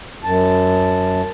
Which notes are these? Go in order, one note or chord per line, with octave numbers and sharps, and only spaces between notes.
F#2 A5